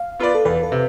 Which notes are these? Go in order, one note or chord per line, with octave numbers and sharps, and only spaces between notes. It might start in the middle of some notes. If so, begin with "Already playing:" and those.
Already playing: F5
B3 F4 B4 D5
A4
E2 B4
A4
C3